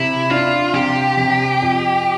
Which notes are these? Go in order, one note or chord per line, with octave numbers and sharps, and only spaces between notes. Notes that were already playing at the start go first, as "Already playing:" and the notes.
Already playing: C3 E4
D4 F4
C3 G4
C3
F2